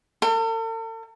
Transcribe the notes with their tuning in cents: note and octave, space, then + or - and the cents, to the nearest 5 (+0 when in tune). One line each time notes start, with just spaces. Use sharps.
A4 +45